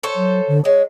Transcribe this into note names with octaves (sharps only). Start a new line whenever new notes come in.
A4 C5 C#5
F#3
D3
G#3 C#5